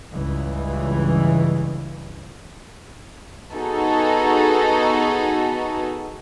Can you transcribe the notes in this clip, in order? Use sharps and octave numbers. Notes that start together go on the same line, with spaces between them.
C#2 G2 C#3 E3
B3 D#4 F#4 G#4 A4